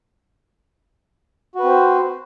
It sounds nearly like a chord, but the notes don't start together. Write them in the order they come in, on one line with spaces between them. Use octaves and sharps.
F#4 B4 C4 C5